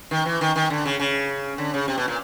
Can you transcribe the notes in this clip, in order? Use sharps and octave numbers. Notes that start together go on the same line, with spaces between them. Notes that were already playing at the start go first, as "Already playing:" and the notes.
D#3
E3
D#3
D#3
D3
C#3
C#3
D3
C#3
C3
B2
A#2